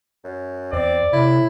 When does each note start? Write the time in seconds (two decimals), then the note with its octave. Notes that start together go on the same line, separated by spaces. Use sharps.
0.24 F#2
0.73 E2 C4 D5
1.13 A2 C3 E4